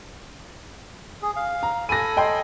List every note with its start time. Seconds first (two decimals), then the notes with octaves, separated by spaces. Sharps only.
1.22 G#4
1.36 F5
1.63 A#5
1.89 A4 G#5 B5 A#6 D#7
2.17 D#5 G5 C6